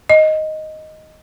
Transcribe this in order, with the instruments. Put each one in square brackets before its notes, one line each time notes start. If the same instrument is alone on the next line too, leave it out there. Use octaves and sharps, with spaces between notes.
[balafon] D#5